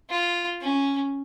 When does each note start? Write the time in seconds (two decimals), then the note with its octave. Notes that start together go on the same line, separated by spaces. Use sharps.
0.10 F4
0.62 C#4